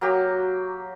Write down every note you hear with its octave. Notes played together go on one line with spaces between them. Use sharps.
F#3 A#3 F#4 G4